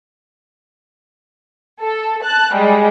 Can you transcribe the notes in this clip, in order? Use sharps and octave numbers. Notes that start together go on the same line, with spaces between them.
A4
A5 F#6
G3 G#3